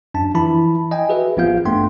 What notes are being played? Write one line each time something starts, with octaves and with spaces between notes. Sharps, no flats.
F#2 D4 A5
E3 F3 E4 A5 B5
D#5 G5 G#5
F#4 G#4 B4 E5
A1 F3 B3 F4 F5 G6
G2 A3 B3 D4 G5 C6